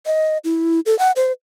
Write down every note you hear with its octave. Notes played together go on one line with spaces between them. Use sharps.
D#5
E4
A4
F#5
C5